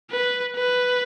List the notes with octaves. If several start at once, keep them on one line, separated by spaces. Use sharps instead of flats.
B4
B4